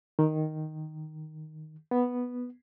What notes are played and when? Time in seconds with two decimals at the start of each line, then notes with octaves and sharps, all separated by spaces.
0.19 D#3
1.91 B3